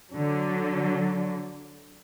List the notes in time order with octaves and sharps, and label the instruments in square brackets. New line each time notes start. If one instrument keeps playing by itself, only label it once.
[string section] D3 F#3